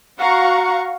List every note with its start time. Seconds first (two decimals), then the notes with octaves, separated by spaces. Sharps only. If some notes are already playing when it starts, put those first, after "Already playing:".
0.18 F#4 F5 F#5 A#5 C#6